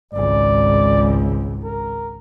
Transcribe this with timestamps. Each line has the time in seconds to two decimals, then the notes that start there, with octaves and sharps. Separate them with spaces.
0.13 G#1 C#2 D5
1.64 A#4